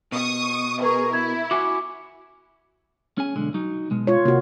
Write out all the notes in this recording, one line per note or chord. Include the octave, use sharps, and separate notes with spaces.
B2 C#6 D#6
G#4 A#4 B4 C#6
E4 G#6
F#4 F#5 G#5 D6
C#4 G#4 G#5
B1 D3 G#3
F#3 D#4
B2 G#3
F4 C#5
C3 A#3 F#4